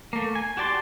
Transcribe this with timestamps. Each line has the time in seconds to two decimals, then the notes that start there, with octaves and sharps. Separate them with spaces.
0.13 A3 A#3
0.35 G#5
0.57 F#4 G4 D5 A5 C6